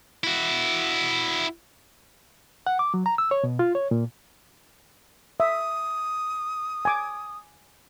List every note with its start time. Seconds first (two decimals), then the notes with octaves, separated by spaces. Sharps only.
0.24 E4 F#4
2.67 F#5
2.79 D6
2.94 F#3
3.06 A#5
3.18 E6
3.31 C#5
3.44 B2
3.59 F4
3.75 C#5
3.91 A#2
5.40 E5 D#6
6.85 G#5 D6